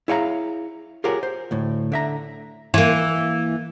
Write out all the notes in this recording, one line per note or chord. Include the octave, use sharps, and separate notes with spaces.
E4 G#4 C#5 F5 G5 A#5
F4 G4 G#4 A#4 C#5 F#5
C5
D2 A2
D3 E5 A#5
E3 A#3